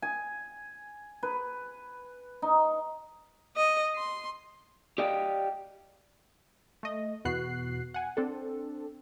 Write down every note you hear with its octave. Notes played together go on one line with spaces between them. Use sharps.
G#5
B4
D#4
D#5
C6
G4 D5 D#5 F5 G5
A3 D#5
E2 B2 B3 F#4 F#6 C7
F#5 G#5
C4 D4 A4